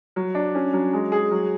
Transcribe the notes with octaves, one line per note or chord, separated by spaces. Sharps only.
F#3
D4
C#4
F#3
G#3
G#4
F#3